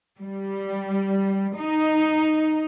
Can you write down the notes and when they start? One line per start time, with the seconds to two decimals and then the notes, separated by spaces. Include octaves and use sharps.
0.20 G3
1.58 D#4